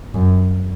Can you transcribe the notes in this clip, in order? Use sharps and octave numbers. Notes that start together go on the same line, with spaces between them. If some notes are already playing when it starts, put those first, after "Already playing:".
F#2